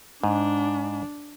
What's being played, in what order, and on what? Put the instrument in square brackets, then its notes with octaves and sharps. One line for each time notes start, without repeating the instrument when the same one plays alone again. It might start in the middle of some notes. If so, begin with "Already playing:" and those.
[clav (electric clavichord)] G#2 [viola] D4